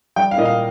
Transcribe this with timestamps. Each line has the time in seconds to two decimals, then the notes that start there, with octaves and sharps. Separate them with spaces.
0.16 G3 G5
0.31 F5
0.38 A#2 D#5
0.45 F5